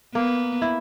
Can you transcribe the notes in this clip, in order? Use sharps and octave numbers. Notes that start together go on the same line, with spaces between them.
A#3 B3
E4